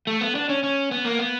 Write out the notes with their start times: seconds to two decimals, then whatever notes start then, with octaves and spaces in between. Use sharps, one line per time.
0.07 A3
0.21 B3
0.35 D4
0.49 C#4
0.64 C#4
0.91 B3
1.05 A#3
1.19 B3